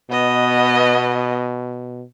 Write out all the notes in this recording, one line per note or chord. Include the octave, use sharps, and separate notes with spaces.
B2 B3 D#5